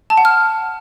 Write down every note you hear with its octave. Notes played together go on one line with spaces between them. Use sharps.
A5
F#5
F6